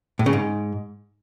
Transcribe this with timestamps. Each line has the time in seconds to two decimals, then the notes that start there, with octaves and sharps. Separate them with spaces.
0.19 A2
0.26 C#3
0.33 G#2